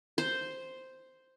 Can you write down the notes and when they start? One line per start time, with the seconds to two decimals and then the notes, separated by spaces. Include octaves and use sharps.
0.18 C5